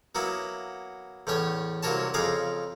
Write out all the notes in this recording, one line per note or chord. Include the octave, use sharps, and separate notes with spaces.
F#3 A#3 B3 E4
E2 A2 C#4 C#5
C2 F#3 A#3 A#4 C#5 A5
F2 C#3 G#4 F5 A#5 D6